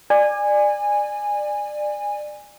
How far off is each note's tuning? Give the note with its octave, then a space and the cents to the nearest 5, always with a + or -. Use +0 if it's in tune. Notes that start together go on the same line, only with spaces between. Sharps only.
D5 +25 G#5 -15